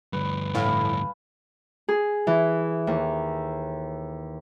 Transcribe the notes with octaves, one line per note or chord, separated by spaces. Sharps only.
D2 G2 B4
A2 F5 G#5 B5
G#4
E3
D#2